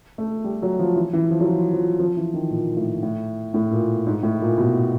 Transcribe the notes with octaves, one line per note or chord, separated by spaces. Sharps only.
A3
G3
F#3
F3
E3
E3
F3
F#3
F3
F3
F3
E3
D#3
A#2
A2
A2
A2
A#2
G#2
A2
A#2
B2